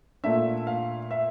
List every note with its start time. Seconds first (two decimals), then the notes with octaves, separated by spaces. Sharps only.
0.24 A#2 A3 D4 E5
0.67 F5
1.11 E5